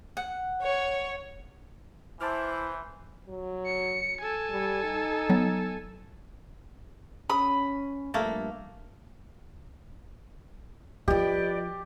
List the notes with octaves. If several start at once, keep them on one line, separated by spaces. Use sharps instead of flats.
F#5
C#5
E3 E4 C5 A5 D6 F6
F#3
C#7
A4 G#5
G3
D#4
F#3 B3
C#4 B5 D#6
G2 F3 A3 A#3
F3 F4 G4 B4 D5 D#5